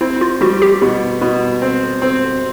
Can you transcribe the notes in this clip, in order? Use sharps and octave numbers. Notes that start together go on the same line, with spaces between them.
C4 E4
F4
G3 F#4
G4
B2
B2
C4
C4